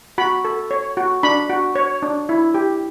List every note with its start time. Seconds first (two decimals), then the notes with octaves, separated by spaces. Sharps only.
0.18 F#4 B5
0.45 A4
0.71 C#5
0.97 F#4
1.23 D4 B5
1.49 F#4
1.75 C#5
2.02 D4
2.29 E4
2.54 G4